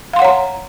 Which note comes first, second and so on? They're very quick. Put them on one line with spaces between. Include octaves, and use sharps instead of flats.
F5 C6 F#5 C#5 A#5